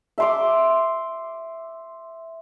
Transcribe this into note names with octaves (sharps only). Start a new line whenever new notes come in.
E5 C6 D6